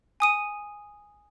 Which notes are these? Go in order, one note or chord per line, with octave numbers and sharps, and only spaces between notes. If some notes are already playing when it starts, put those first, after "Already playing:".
G#5 D#6 D#7